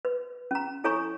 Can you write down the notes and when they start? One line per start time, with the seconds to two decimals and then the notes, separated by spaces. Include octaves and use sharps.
0.05 B4
0.51 C#4 A#5
0.84 E4 A4 C#5 G#5 A#5 C#6